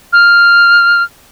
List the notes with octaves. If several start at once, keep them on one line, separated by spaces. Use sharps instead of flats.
F6